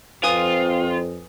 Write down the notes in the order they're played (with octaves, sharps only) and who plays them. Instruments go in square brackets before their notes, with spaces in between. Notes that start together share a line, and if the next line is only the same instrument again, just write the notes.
[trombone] F2 [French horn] C4 [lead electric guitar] F4 [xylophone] B4 G#5 D#6